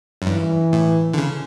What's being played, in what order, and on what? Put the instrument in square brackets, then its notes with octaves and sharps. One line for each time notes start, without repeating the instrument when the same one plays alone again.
[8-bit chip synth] F#2
[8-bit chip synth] G2 [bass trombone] E3
[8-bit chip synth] A2
D3
C#3